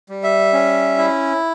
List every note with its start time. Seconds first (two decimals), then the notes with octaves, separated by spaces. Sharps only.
0.09 G3
0.23 E5
0.53 C#4
0.98 E4